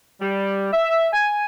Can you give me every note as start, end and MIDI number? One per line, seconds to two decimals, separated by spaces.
0.20 0.67 55
0.72 1.07 76
1.13 1.45 80